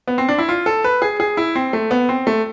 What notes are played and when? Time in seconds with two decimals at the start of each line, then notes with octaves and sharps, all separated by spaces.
0.08 B3
0.18 C4
0.29 D4
0.38 E4
0.49 F4
0.66 A4
0.84 B4
1.02 G#4
1.20 G#4
1.37 E4
1.55 C4
1.73 A3
1.91 B3
2.09 C4
2.27 A3